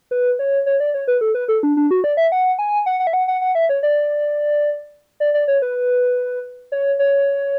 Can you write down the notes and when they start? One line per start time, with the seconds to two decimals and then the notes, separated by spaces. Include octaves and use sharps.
0.11 B4
0.39 C#5
0.66 C#5
0.80 D5
0.94 C#5
1.08 B4
1.21 A4
1.34 B4
1.48 A4
1.63 D4
1.77 D4
1.91 F#4
2.04 D5
2.17 E5
2.32 F#5
2.59 G#5
2.86 F#5
3.00 F#5
3.07 E5
3.13 F#5
3.28 F#5
3.41 F#5
3.55 E5
3.69 C#5
3.83 D5
5.20 D5
5.34 D5
5.48 C#5
5.62 B4
6.72 C#5
6.99 C#5